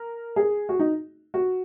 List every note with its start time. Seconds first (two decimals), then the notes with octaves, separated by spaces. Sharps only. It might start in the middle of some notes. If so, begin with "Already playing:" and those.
Already playing: A#4
0.36 G#4
0.69 F#4
0.79 D#4
1.34 F#4